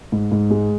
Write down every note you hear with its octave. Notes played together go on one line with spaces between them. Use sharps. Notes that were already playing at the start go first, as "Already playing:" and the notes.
G#2
G#2
G#3